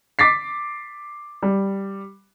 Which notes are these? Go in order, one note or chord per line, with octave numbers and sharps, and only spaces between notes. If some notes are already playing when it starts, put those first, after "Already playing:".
D6 A6 B6 C7
G3